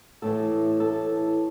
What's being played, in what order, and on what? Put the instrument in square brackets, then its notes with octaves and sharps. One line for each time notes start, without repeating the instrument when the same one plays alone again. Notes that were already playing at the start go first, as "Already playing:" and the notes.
[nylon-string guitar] A2 E3 A3 A4
A4